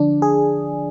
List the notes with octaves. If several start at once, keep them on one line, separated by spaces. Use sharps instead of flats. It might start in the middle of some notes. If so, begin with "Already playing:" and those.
Already playing: D3 F3 D4
G#4